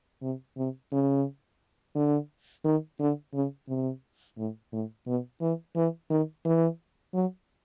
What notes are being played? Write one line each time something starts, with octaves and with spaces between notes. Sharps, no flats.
C3
C3
C#3
D3
D#3
D3
C#3
C3
A2
A2
B2
E3
E3
D#3
E3
F#3